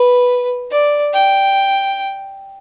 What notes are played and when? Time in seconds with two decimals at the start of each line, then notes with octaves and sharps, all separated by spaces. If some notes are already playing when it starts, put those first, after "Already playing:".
Already playing: B4
0.71 D5
1.13 G5